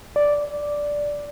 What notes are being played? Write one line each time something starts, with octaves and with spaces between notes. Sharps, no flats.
D5